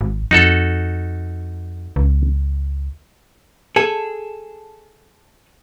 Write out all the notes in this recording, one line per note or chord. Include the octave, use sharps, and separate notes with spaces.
G#1
F2 D#4 F#4 A4
C#2
G#4 A4